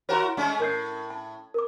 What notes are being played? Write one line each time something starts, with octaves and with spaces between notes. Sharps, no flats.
E4 F#4 A#4 C#5 A#5 C6
G#3 A3 C#4
A2 A#4 G6 C7
A5
A#4 D6